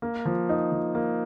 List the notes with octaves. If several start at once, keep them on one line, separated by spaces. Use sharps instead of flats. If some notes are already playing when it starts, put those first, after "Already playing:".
A#3
F3
D#4
F3
A#3